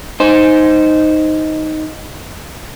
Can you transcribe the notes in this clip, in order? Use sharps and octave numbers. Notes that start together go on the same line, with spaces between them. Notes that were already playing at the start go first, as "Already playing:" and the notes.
D#4 C5